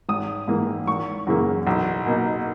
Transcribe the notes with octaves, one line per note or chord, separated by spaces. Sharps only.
G#1 D#6
G#2 E3 A#3
G#1 C#6
F#2 C#3 E3 A#3
B1
B2 A#3 D#4